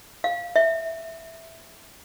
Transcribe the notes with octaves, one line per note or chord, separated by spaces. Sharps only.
F5
E5